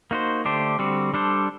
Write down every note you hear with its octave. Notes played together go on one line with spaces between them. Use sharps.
A#3 D#4 F#4 C5
D3 A3 D4 G4 C5
D3 G3 C4 F#4
G3 D4 A4 C5